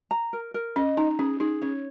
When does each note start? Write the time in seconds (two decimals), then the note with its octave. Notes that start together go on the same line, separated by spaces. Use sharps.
0.11 A#5
0.33 A#4
0.54 A#4
0.76 C#4 D#5
0.97 D#4 A#5
1.19 C#4 G#4
1.40 D#4 G#4
1.62 C#4 C#5